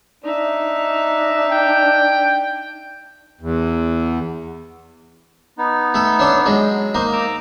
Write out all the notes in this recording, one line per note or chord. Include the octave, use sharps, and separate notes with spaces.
D4 D#4 E5
G5
E2
B3 D#4
A3 A4
C#4 D4 A4
F#3 G#3
A#3 D#4 C5
A#5 D6 E6